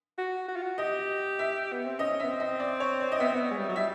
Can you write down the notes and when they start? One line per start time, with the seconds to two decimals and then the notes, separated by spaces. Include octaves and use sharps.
0.18 F#4
0.48 F#4
0.56 F4
0.63 F#4
0.78 G4 D#5
1.39 E5
1.72 B3
1.86 C4
1.99 C#4 D#5
2.20 B3 E5
2.29 C4
2.40 D#5
2.60 D5
2.80 C#5
3.00 D5
3.12 D#5
3.20 B3 E5
3.28 C4
3.35 B3
3.51 G#3
3.59 G3
3.69 F#3
3.76 G3 E5